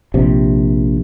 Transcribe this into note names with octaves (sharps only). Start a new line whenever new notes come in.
A#1 C3